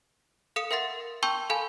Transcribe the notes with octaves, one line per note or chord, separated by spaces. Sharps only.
A4 F5 D#6 C#7 E7
A#4 E5 F#5 C6 A6
G5 A5 C6 C#6 E6 G6
A4 F5 G#5 A5 B5